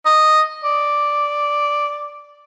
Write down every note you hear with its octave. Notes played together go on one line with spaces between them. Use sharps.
D#5
D5